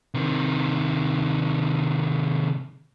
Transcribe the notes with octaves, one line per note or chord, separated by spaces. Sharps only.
C3 D#3